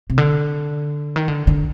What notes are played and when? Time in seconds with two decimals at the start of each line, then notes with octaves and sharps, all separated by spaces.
0.10 C3
0.18 D3
1.16 D#3
1.28 D3
1.47 D3